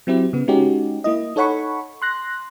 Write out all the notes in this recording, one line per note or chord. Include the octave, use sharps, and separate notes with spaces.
F#3 C4 E4 G4
C#3 B3
G#3 C#4 D#4 F#4 G4
A#3 E4 D#5
D#4 A4 C#5 F#5 B5 C#6
C6 F#6 A#6